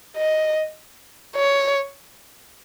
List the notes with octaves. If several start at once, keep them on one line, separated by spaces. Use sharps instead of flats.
D#5
C#5